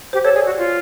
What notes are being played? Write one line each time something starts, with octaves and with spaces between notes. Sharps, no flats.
G4 C5
A4 C#5
G#4 D5
F#4
F4